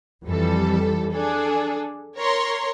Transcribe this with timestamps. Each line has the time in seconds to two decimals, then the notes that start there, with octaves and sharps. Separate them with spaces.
0.24 F2 E3 G3 A4
1.13 D4 G#4 A4
2.16 A#4 C#5 A#5 C6